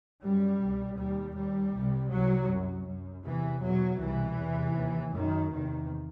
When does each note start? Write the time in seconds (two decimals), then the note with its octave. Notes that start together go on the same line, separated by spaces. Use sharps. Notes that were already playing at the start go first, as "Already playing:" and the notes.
0.22 F#2 G3
0.60 C2 B2
0.98 D#2 G3
1.36 D#2 G3
1.74 C2 C3
2.11 C2 C3 F#3
2.49 F#2
2.87 F#2
3.25 E2 C3 E3
3.63 E2 B2 F#3
4.00 C2 B2 E3
4.38 E2 C3
4.76 D#2
5.13 F#2 D#3
5.51 E2 C3 D#3